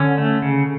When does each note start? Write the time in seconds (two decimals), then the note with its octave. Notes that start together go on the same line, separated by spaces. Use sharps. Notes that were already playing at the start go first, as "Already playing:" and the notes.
Already playing: D3 C#4
0.18 A3
0.42 C#3